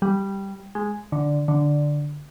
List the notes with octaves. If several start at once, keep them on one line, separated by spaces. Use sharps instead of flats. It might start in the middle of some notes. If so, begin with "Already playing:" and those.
G3
G#3
D3
D3